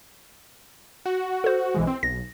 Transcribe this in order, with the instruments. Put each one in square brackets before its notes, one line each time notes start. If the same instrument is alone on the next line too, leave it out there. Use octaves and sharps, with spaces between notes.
[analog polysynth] F#4
[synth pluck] A4 C5
[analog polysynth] B1 E3 G#3
C4
[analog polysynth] B1 [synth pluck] A#6